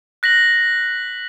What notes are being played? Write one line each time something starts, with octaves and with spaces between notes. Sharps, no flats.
F#6 A#6 B6 F#7